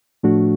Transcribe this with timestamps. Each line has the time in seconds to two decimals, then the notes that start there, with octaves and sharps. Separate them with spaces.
0.23 A2 F3 A3 D4 F#4